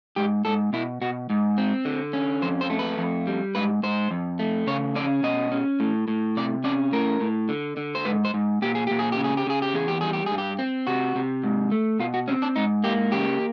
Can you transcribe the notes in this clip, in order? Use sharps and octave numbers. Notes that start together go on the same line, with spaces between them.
G#2 G4
G#2 A4
B2 E4
B2 F#4
G#2
C4
D3
C#4
F2 C5
C5
A3
B4
F2
G3
G#2 B4
G#2 C5
F2
A3
C#3 C#5
C#4 D5
B2 D#5
C#4
A2
A2
C3 D5
C#4 D5
A2 A#4
A2
D3
D3
C5
G#2 B4
C5
G#2
A#2 G4
G#4
A#2 G4
G#4
G4
C#3
G#4
G4
C#3 G#4
G4
E2 G#4
G4
G3 G#4
G4
G2 G#4
G4
C4
C3 F#4
C3
G#2
A3
B2 F4
F#4
C4 C#4
D4
G#2 D#4
A#3 G4
C#3 G4